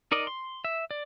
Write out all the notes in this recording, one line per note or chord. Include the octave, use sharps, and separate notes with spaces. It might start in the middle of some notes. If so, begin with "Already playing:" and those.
D#4 A#4 D5 D#5
C6
E5
D5